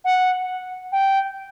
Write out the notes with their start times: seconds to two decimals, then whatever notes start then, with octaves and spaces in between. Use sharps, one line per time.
0.04 F#5
0.92 G5